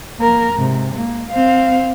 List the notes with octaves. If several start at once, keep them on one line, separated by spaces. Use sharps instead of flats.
A#3 A#4
G#2 C3
A#3
C4 F5